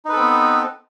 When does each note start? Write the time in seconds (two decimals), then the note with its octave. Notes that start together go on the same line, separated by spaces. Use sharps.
0.05 D#4
0.09 B4
0.13 A4
0.16 C4
0.20 B3